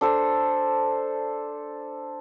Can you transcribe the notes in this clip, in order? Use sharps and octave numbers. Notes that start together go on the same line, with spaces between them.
D4 A4 C5